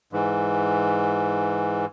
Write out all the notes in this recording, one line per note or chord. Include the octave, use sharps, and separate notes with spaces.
G#2 E3